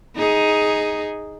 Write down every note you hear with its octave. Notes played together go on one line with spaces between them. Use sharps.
D#4 G#4